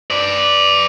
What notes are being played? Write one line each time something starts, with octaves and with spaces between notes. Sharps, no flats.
B4 D5